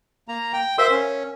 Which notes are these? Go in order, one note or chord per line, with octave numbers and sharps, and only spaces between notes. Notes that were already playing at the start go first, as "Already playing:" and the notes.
A#3 A#5
G5
A#4 C5 E5 F5 C6
C#4